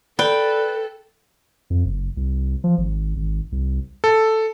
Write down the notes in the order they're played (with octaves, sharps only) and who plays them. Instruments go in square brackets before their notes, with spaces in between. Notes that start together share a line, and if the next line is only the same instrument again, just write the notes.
[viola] A4 [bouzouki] B4 [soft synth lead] D5 [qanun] G5
[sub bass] F2
F#1
C2
F3
G#1
G#1
C2
[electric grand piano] A4